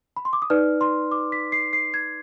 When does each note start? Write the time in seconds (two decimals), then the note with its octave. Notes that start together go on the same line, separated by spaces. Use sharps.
0.16 B5
0.25 C6
0.33 D6
0.42 D#6
0.50 D#4 B4 D5 F6
0.81 C6
1.12 D6
1.32 B6
1.52 C7
1.73 C7
1.94 G#6